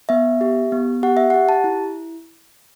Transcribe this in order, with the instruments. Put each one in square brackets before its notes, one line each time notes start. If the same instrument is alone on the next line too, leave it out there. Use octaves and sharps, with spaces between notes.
[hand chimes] B3 E5
G4
B3
G4 F#5
E5
G4 F#5
A5
E4